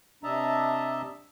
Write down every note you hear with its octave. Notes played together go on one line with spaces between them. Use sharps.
C3 D4 D#5 E5 A5 A#5